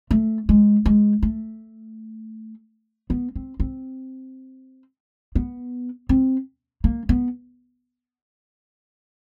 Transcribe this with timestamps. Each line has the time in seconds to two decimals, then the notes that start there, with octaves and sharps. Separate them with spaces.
0.11 A3
0.49 G#3
0.86 G#3
1.23 A3
3.10 B3
3.36 C4
3.60 C4
5.35 B3
6.09 C4
6.84 A#3
7.09 B3